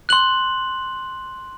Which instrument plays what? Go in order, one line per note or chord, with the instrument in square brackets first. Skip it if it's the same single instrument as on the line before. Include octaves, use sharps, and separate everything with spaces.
[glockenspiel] C6 F#6 F#7